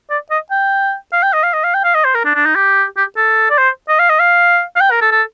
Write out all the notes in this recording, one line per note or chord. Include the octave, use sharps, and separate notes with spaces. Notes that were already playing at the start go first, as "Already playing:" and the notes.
D5
D#5
G5
F5
G5
D#5
F5
D#5
F5
G5
F5
D#5
C5
A#4
D4
D4
D#4
G4
G4
A4
D5
C5
D#5
F5
D#5
F5
F5
G5
A#4
A4
A4